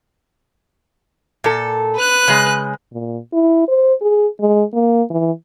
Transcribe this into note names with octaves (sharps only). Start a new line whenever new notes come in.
A#2 A4
B4 F#6
C#3 G#3
A#2
E4
C5
G#4
G#3
A#3
E3